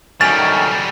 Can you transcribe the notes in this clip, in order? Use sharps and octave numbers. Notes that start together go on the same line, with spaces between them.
D2 D#3 F#3 G3 C#4 G5 A6